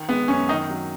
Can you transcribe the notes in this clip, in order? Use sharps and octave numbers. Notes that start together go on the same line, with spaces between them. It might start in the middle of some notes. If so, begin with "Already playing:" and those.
Already playing: D#3
G#3 B3
F#2 C#4
D#3 D#4
F#3